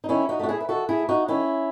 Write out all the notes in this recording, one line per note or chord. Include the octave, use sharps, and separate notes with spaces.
D#4
D#3 C#4 E4
D#4 F#4
A3 F#4
E4 G#4
B4
D#3 F#4 A4
E4 G#4
A3
D#4 F#4
D#3 C#4 E4